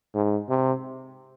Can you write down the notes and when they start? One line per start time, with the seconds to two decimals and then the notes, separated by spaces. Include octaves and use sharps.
0.15 G#2
0.49 C3